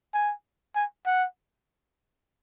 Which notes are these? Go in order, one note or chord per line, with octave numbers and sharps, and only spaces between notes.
G#5
G#5
F#5